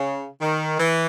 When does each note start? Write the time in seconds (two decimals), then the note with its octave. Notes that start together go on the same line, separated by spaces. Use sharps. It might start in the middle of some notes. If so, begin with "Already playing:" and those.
Already playing: C#3
0.41 D#3
0.78 E3